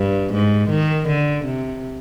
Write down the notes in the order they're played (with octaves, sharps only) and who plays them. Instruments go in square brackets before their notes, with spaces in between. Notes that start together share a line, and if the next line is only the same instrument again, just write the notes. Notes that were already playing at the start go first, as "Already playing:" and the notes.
Already playing: [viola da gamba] G2
G#2
D#3
D3
C3